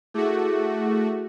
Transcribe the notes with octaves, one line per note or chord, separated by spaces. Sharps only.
A3 E4 F#4 G#4 D6